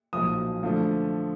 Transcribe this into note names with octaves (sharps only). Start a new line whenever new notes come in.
B1 A#2 F3 D#6
D3 F3 A3